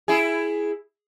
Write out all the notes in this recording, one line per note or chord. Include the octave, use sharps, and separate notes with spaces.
E4 G#4